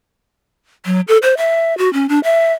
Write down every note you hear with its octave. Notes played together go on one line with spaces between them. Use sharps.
F#3
A4
C5
E5
F#4
C#4
D4
E5